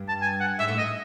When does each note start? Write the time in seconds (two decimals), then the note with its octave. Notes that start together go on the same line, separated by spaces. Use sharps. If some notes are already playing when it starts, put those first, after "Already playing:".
Already playing: G2
0.09 A5
0.22 G#5
0.40 F#5
0.59 G#2 E5
0.68 A2
0.78 D#5